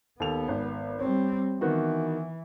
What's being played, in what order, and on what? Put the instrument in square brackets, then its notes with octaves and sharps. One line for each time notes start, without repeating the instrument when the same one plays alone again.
[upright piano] D#2 A4 F7 [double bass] B3
[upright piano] G#1
[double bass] G3 C4 [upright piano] C#5
[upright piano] D#3 B3 F#4 [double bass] E3